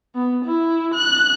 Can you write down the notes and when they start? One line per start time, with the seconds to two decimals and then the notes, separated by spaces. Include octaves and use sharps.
0.15 B3
0.45 E4
0.94 F#6